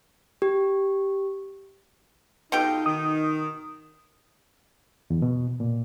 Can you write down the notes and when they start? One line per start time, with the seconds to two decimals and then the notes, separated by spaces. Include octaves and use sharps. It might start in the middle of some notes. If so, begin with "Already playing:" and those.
0.42 G4
2.52 B2 D#4 F4 G4 A4 D#5 G5
2.86 D#3 D#6
5.10 E2
5.22 B2
5.60 A#2